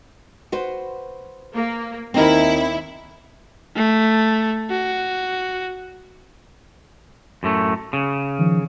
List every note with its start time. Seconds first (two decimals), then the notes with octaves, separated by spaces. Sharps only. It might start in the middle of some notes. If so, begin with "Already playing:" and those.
0.52 F#4 B4 C5
1.54 A#3
2.14 D#2 C4 D#4 E4 A#4
3.76 A3
4.70 F#4
7.43 F#2 A2 A3
7.93 C#3
8.39 D#3 F3